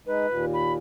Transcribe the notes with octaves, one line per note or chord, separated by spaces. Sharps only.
G#3 D#4 B4
D#2 A#2
B5